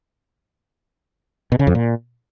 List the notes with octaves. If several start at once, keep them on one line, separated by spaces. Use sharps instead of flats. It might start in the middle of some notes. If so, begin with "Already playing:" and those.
B2
C#3
F2
A#2